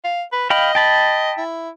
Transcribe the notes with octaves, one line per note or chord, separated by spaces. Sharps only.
F5
B4
D#5 F5 G5 B5
G5 A5 B5
E4